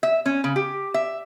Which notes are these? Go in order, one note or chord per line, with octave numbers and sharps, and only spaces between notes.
E5
C#4
C#3
G4
E5